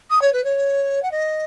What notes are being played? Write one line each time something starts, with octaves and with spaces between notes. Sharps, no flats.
D#6
C#5
B4
C#5
F#5
D#5